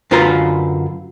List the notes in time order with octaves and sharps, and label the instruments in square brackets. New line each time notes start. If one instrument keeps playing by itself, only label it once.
[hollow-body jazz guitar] F#2 D3 F4 B4 C5 A#5